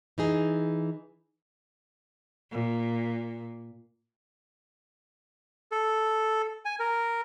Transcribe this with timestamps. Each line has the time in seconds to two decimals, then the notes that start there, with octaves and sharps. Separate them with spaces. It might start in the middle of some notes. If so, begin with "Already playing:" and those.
0.18 E3 D#4 G#4
2.51 A#2
5.72 A4
6.65 G#5
6.80 A#4